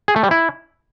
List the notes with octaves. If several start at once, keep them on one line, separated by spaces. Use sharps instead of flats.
G#4
A3
G3
E4